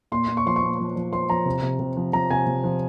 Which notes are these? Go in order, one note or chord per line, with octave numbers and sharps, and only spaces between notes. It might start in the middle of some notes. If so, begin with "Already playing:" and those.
A#2 C6
A#2
C#6
F3 C6
C#6
A#2
F3
F3
F3 C6
F3 A#5
C3
C3
C3
F3
F3 A#5
C3 G#5
C3
F3